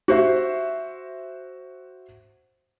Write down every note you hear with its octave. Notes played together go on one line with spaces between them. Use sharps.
F#4 C5 E5